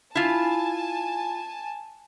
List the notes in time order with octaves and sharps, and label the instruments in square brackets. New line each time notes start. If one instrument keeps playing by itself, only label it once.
[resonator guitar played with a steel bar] E4 F4 [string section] G#5 A5